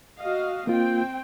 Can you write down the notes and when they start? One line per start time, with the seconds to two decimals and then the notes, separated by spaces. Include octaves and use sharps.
0.19 F#4 D#5 F5
0.67 A#3 C4 F4 G5